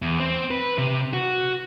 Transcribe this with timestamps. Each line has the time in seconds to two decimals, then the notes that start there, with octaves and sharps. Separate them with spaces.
0.02 E2
0.20 C4
0.51 B4
0.78 C3
1.13 F#4